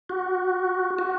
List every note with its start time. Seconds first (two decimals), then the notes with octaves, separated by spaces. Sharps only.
0.09 F#4
0.99 F#4